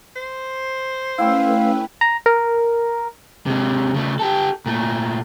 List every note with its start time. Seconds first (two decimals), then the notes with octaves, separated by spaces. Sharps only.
0.16 C5
1.18 A3 C#4 E4 B4 F5 G5 E6
2.01 A#5
2.26 A#4
3.46 C3 G#3
3.94 C#3 A3
4.19 G4 A4
4.66 A#2 A3